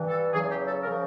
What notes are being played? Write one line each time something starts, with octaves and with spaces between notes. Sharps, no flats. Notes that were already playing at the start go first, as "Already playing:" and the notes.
Already playing: G2 E3
A4
E2 C#3 F#3 G#4
G4
A4
A#4
C#3 F3